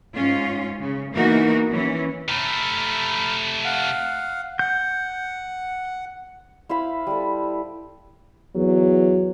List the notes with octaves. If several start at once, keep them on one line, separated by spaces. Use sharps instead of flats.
G#2 C#4 F4
C#3
E3 A#3 B3 D#4 F#4 A#4
E3 C#4
C3 A3 A#5 B5 F6
F5 F#5
F#5 G6
E4 C5 F5 B5
G3 A4
E2 F#3